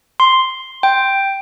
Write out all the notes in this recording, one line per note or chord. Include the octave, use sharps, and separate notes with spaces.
C6
G5